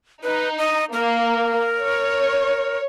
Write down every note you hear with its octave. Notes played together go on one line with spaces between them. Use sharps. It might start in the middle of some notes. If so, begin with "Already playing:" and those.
D#4 B4
D#5
A#3 A#4
C#5